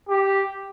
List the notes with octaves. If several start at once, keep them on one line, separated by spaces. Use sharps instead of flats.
G4